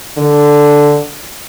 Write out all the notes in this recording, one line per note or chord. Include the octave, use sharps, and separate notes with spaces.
D3